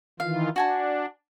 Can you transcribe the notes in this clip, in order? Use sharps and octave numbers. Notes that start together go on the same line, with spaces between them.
D#3 E3 F4 F5
D4 F#4 G#5 A5